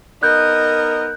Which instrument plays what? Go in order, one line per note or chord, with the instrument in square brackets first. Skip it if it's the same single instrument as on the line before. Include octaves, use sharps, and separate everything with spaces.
[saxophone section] B3 D#4 A#4 [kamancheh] D#5 [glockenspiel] F#6 G6